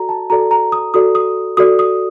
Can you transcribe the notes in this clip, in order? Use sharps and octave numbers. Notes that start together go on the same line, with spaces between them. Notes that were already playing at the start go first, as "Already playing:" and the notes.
Already playing: F#4 A4 D5 A#5
A5
F#4 A4 D5 A#5
A#5
D#6
F#4 A4 D5 D#6
D#6
F#4 A4 D5 D#6
D#6